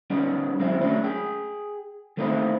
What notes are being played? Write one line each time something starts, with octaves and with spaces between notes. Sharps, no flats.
G3 B3 C#4 D#4
F#3 G#3 C4 E4
A3 C#4 D4 E4 F#4 A#4
G#4 G5
E3 A3 A#3 C4 D#4 E4